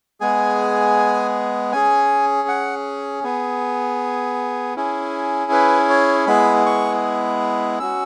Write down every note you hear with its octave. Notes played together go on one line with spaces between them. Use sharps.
G#3 B3 G#4 G#5
C#4 G#4 G#5
F#5
B3 G#4
C#4 E4 G#4
B4
C#5
G#3 B3 E4 G#4 B5
C#6
C#4 F#4 E6